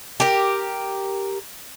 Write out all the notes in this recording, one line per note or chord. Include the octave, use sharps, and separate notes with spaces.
G4 A#4